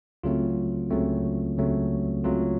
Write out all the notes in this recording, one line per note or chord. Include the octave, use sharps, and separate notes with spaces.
C#2 C#3 F#3 A3 C4 F4
C#2 C#3 F#3 A3 C4
C#2 C#3 F#3 A3 C4
C#2 C#3 F#3 A3 C4 F4